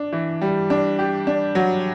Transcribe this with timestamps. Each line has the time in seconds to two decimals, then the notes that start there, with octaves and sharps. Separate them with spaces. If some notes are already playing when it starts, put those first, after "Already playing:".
Already playing: D4
0.13 E3
0.41 G3
0.70 D4
0.99 G4
1.27 D4
1.55 F#3